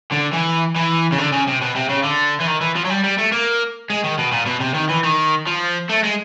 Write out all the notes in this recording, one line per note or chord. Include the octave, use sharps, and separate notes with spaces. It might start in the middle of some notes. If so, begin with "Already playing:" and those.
D3
E3
E3
C#3
D3
C#3
C3
B2
C3
C#3
D3
E3
D#3
E3
F3
F#3
G3
G3
A3
A#3
G#3
D#3
B2
A#2
B2
C3
D#3
E3
D#3
F3
A3
G#3